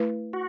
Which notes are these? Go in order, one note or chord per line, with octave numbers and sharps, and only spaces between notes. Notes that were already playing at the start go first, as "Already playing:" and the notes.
Already playing: A3 E4 B4
F#4